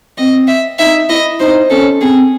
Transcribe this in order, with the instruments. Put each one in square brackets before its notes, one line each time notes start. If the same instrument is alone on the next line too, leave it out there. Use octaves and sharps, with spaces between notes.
[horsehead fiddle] C4 [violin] D#5
[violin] E5
[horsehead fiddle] D#4 [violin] E5
[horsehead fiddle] E4 [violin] D#5
[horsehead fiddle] D#4 [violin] C5
[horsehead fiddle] C#4 [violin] A4
[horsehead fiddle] C4 [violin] G#4